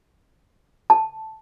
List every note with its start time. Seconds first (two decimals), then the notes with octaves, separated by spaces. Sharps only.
0.90 A5